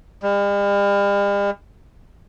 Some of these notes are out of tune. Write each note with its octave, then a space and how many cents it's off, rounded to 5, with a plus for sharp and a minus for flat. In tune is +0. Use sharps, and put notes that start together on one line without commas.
G3 +45